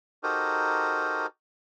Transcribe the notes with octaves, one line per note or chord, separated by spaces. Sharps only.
D#4 F#4 G4 A4 A#4 C5